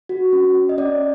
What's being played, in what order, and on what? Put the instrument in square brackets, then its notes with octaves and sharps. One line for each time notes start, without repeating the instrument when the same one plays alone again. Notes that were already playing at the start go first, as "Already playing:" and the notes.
[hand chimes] F#4
C#4
C#4
D#5
C#4 D5